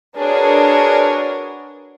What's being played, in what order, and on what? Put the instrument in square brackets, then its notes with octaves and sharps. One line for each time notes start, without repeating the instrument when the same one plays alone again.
[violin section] D4 G#4 A#4 [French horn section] F#4 B4 C#5